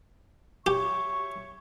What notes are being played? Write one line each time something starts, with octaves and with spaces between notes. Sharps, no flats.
G4 C#5 E5 C#6